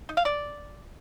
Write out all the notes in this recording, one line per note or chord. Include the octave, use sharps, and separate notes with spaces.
D#4
F5
D5